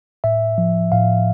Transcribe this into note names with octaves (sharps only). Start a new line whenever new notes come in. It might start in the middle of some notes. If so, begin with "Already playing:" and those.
A2 E5
F3
A2 F5